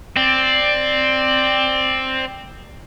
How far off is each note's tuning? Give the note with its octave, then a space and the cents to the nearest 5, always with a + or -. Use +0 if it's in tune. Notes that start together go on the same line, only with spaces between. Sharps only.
C4 +5 D5 +10